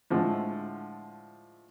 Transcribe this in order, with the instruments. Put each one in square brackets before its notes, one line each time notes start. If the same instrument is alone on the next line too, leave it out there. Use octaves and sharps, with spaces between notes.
[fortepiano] A2 D3 F3 G#3